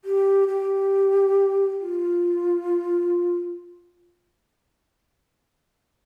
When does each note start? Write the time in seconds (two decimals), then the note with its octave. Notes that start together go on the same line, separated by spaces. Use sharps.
0.05 G4
0.48 G4
1.81 F4